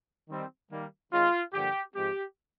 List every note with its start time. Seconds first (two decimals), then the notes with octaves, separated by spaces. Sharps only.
0.29 D#3 G3 C4
0.71 D#3 G3 A#3
1.11 D#3 G#3 C#4 F4
1.53 G2 D3 F3 A#3 G4
1.95 G#2 F3 G#3 C4 G4